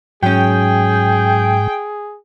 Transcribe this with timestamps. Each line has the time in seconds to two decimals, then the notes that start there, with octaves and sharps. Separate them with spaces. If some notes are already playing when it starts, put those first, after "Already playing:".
0.23 G#2 F#3 C#4 G#4 G5